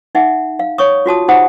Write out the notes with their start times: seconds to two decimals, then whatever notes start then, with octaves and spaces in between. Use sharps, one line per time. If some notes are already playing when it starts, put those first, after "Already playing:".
0.15 D#4 E5 F#5
0.59 F5
0.78 C#5 C#6 D#6
1.06 F4 F#4 A5 D#6
1.28 D#4 G4 C5 F#5 B5 D#6